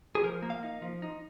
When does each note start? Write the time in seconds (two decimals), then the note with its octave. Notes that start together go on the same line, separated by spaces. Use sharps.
0.15 G#4
0.23 F3 A#4
0.42 A#3
0.50 F5
0.63 D#4
0.82 F3
1.02 D#4